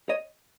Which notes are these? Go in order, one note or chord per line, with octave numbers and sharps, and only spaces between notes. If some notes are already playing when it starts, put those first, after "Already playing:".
C#5 D#5